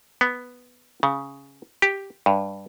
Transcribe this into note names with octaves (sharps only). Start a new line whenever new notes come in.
B3
C#3
G4
G2